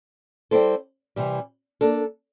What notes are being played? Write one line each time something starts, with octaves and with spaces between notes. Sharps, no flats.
G3 C4 E4 A4 C5
C3 E3 G3
A#3 D4 A4